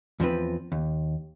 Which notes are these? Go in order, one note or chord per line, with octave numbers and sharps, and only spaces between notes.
E2 F3 C4 B4
D#2